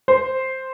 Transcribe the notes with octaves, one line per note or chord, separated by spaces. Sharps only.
C5